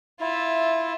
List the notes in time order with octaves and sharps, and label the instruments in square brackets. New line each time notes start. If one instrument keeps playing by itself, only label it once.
[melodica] E4 [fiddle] F4 E5